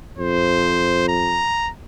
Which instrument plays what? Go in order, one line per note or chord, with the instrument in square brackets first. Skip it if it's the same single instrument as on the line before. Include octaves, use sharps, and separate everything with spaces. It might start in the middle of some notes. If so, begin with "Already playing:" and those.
[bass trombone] F2 [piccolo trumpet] C5
[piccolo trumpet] A#5